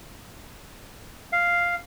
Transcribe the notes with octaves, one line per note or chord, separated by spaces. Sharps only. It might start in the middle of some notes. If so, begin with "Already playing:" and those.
F5